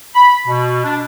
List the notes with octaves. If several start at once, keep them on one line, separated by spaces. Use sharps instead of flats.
B5
B2
D4